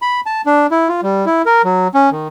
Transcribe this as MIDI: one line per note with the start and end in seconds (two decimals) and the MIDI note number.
0.02 0.21 83
0.26 0.42 81
0.46 0.67 62
0.71 0.88 64
0.89 1.01 65
1.03 1.25 55
1.26 1.42 64
1.46 1.62 70
1.64 1.88 54
1.94 2.10 61
2.11 2.28 51